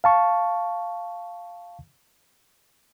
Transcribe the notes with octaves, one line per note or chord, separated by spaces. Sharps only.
F5 A5 C#6